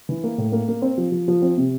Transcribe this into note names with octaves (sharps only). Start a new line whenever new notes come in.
E3
A#3
A2
A#3
A#3
C4
F3
F3
F3
C4
C3